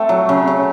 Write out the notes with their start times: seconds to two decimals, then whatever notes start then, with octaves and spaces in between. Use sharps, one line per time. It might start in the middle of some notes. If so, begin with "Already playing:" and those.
Already playing: A3 C4
0.09 F#3
0.29 C#3
0.47 C#3